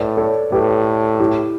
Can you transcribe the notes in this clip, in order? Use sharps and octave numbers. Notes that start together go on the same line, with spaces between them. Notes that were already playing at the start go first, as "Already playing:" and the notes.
Already playing: A2 B4 D5
A4 C#5
A2 G4 B4
E4 G4